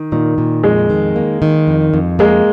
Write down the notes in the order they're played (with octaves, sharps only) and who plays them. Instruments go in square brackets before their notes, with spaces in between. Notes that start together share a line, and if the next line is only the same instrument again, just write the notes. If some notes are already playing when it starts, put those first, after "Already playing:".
Already playing: [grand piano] D#3
[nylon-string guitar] A#2 [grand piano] D#3
[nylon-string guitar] A#2
[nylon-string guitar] F2 [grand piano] G#3
[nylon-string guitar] D#3
A#3
D#3
F2
F2
[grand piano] G#3 [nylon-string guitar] A#3